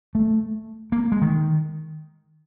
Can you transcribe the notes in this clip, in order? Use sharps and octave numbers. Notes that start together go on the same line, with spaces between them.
A3
A#3
G#3
D#3